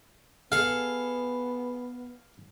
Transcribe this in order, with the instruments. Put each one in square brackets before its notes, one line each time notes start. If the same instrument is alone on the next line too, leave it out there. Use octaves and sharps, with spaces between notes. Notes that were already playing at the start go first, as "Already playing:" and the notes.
[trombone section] B3 [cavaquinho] G#4 A4 [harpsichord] F5